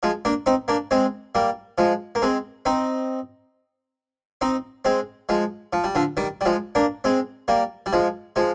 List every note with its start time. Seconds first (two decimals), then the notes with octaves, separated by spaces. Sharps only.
0.03 F3 G#3
0.25 A#3 D4
0.46 C4 D#4
0.68 A#3 D4
0.91 G#3 C4
1.35 G3 A#3
1.78 F3 G#3
2.15 A#3
2.22 G#3 C4
2.66 C4 D#4
4.41 C4 D#4
4.85 G#3 C4
5.29 F3 G#3
5.73 F3
5.84 G3
5.95 D3 F3
6.17 D#3 G3
6.41 G3
6.45 F3 G#3
6.75 A#3 D4
7.04 G#3 C4
7.48 G3 A#3
7.86 G3
7.93 F3 G#3
8.36 F3 G#3